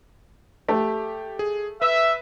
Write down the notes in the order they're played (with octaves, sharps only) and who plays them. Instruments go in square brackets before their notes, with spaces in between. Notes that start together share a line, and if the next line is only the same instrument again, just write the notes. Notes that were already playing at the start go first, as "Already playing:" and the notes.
[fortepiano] A3 [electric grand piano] G4
[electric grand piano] G#4
[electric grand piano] B4 [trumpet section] E5